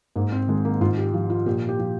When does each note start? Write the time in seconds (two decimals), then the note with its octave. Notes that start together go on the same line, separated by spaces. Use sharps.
0.16 G#2 A#3
0.32 C4
0.48 D#3 G#3
0.65 A#3
0.81 G#2 F4
0.97 G4
1.13 F3
1.30 F4
1.46 A#2 G4
1.69 G4
1.79 F3